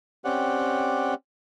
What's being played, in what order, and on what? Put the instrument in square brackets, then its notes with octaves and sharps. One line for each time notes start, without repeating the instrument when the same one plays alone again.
[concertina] C4 C#4 G4 D5 F#5